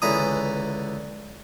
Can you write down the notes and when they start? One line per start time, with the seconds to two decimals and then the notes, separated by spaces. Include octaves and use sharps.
0.02 C#2 D3 E3 A#5 B5 D#6